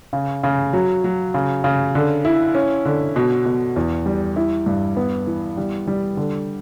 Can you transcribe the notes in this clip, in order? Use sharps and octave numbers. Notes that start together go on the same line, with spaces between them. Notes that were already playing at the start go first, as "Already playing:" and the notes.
C#3
C#3
F#3
F#3
C#3
C#3
D3
E4
C#4
D3
B2
B2
E2
G3
E4
G2
B3
E3
G3
G3
D3